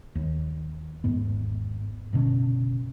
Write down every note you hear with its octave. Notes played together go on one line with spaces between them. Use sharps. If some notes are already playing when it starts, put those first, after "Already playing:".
D#2
G#1 E2 G#2 B3
F#1 B2 D3 C#4